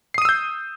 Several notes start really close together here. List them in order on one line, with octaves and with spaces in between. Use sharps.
C7 D#6 D#7 E6 G6